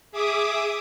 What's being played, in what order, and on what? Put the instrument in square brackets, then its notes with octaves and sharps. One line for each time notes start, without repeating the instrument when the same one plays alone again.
[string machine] G#4 E5 D6 D#6